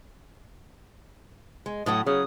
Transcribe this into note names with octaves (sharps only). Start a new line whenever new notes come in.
G#3
A2 F#3 A3 D#6
C#3 F#3 D#6